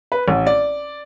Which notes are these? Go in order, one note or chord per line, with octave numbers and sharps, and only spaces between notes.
B4
A1
D5